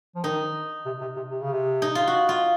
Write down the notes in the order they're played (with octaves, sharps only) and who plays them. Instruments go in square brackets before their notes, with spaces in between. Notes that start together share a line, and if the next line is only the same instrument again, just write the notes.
[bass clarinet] F3
[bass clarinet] D#3 [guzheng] D#4
[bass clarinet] C3
C3
C3
C3
C#3
C3
[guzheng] D#4
F4
F#4
F4